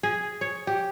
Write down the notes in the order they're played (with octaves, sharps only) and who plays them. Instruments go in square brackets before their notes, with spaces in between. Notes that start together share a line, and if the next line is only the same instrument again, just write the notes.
[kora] G#4
C#5
G4